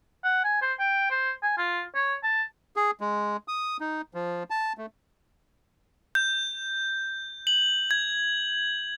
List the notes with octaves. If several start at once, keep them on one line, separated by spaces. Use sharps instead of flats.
F#5
G#5
C5
G5
C5
G#5
F4
C#5
A5
G#4
G#3
D#6
D#4
F3
A5
A3
G6
F#7
G#6